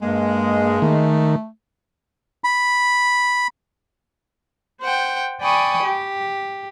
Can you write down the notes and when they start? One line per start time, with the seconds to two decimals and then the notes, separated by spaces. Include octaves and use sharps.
0.01 G2 G#3 A#3
0.82 D#3 A3
2.44 B5
4.82 C5 F#5 G5
5.42 D5 G5 G#5 B5 C#6 D#6
5.85 G4